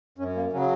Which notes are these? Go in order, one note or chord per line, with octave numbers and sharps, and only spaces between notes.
F#2 C#4
A#3
C#3 F#3 C#4